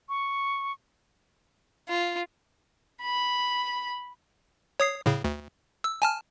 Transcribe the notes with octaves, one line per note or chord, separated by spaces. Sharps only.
C#6
F4
B5
C#5 D#6 C7
A2 C#3
D2
E6
G#5 A5 F6